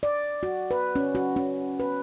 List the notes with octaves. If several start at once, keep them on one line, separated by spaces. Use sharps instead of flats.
D5
F#4
B4
C#4
F#4
C#4
B4